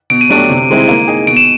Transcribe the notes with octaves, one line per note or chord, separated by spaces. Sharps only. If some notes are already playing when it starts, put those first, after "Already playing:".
B2 D7
D#7
F#3 A3 D4 G4 D7
C3
D#3 G#3 C4 E4
A#3
D#4 G#4
B2 D7
E7